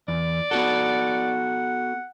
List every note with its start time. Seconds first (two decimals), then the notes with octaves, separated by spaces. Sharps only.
0.08 E2 D5
0.51 B3 F#4 A4 F#5